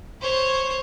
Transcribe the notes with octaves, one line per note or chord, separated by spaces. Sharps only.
C5 C#5